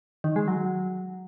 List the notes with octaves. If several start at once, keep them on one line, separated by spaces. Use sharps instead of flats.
D#3
G#3
F#3